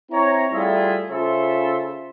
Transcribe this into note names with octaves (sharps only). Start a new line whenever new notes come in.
C4 E4 C#5 A#5
G3 A3 E4 F4 G#4 E5
C#3 F4 A4 C5 E5